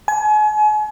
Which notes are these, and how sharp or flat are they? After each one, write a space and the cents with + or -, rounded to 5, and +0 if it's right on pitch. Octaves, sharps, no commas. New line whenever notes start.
G#5 +35